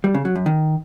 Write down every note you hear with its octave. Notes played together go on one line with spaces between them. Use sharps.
G3
C#3
F#3
F#2
D#3